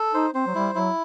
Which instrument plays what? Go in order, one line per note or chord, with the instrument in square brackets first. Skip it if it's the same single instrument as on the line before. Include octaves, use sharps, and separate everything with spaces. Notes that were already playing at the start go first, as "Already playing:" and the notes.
Already playing: [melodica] A4
[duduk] D#4 [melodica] C5
[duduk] C4 [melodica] C5
[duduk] F#3
[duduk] G3 [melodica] E4
[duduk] F#3 [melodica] E4